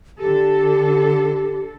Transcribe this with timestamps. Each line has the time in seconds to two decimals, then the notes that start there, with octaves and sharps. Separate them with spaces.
0.19 D3 G4 A4